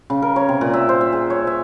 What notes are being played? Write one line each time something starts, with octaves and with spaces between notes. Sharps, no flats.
C#3
A#4
C#5
C3
A#2
E5
C5
E5
G#4
C#5
E5